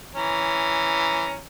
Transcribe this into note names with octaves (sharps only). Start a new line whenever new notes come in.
E3 C#4 A#5